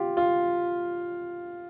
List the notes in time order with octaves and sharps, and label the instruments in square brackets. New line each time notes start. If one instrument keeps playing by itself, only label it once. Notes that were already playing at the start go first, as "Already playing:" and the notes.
Already playing: [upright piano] F4 G4
F4